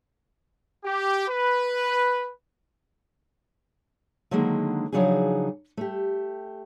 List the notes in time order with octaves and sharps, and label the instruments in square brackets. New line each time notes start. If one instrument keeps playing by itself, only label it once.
[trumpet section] G4
B4
[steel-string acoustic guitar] D3 D#3 F#3 G#3 A#3
C#3 F3 F#3 D4 D#4 G#4
A3 G4